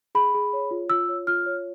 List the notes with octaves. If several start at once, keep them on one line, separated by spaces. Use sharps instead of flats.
G#4 B5
G#4
C#5
F4
F4 E6
C#5
F4 F6
C#5